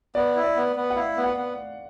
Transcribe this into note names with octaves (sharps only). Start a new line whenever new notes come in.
B3 D5
E4
D5
B3
B3
F#5
E4 F5
B3
F#5
B3